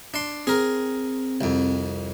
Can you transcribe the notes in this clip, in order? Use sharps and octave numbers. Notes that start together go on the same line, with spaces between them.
D4 C6
C4 G#4 A#4
C2 F2